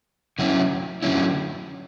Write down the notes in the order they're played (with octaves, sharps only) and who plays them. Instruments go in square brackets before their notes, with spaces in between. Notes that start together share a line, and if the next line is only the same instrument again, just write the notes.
[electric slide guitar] D3 F#3 C#4 E4
D3 F#3 C#4 E4